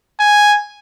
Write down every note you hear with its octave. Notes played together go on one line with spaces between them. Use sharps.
G#5